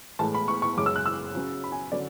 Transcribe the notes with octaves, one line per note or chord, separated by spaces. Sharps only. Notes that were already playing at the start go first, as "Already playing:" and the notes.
A2 E3 G#3 A5
B5
C#6
C#6
F#2 C#3 G#3 D6
E6
F#6
E6
C#3 F#3 C#4
B5
G#5
D3 F#3 C#4 D5